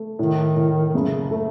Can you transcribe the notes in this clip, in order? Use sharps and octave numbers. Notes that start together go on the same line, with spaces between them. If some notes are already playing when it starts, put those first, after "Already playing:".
Already playing: A3
A2 D#3
A2
D#3
F#1 C#3
A3